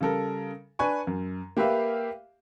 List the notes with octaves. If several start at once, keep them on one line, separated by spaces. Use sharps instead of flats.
C#3 G3 A4 A#4
D4 B4 G#5 C#6
F#2
A#3 G4 B4 E5 F5